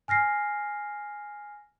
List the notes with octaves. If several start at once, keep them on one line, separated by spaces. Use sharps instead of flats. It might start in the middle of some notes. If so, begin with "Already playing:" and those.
G#5 F6 A#6 C7